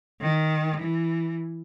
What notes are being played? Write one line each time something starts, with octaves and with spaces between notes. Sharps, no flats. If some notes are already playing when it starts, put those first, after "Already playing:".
D#3
E3